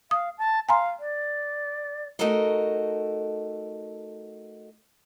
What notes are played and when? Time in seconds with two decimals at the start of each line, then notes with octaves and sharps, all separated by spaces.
0.11 F5 D#6
0.38 A5
0.69 F5 G#5 A#5 C6
1.00 D5
2.19 A3 D#4 F#4 A4 A#4 D#5